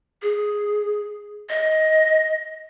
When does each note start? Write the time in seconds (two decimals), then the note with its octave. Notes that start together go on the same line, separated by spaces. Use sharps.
0.22 G#4
1.50 D#5